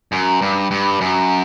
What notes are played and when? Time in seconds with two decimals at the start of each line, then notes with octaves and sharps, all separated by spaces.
0.12 F#2
0.42 G2
0.71 G2
1.01 F#2